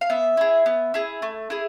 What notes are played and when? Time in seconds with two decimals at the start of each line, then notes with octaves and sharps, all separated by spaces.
0.01 F5
0.10 B3 E5
0.37 E4 G#4
0.66 B3
0.94 E4 G#4
1.22 A3
1.50 E4 G#4